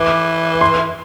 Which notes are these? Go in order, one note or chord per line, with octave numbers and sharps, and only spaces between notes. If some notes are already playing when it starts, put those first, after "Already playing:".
Already playing: E3 D6
C6